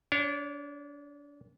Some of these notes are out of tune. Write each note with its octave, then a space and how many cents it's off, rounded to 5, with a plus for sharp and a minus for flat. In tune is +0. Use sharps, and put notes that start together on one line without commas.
D4 -30 C#5 +0